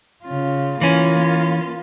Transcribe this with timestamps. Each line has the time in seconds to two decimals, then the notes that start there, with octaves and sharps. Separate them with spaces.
0.24 C#3 F4
0.81 E3 A#3 C#4 F4